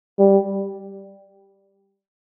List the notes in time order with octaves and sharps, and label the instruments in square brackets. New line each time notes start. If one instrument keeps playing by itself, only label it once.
[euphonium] G3